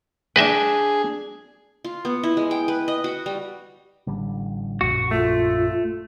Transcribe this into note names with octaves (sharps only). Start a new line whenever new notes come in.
D4 G#4 B4 D#5 E5 G5
F4
B3
E4
G#3
G5
B4
D#5
F#4
G3
A1 D3 G3
A#1 F#2 A#2 F#4
A3 F4